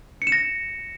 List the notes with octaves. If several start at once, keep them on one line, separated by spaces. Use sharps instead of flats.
C#7
E7
A#6